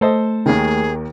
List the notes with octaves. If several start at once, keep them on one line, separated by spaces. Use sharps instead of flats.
A3 A4 C5 D#5
D#2 D#3 G#4